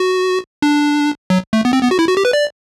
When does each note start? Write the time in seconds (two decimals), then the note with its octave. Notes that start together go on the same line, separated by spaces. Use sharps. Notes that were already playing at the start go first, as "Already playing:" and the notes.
Already playing: F#4
0.62 D4
1.30 F#3
1.53 A3
1.65 B3
1.73 C4
1.83 B3
1.91 F#4
1.99 E4
2.08 F#4
2.17 G4
2.25 B4
2.33 D5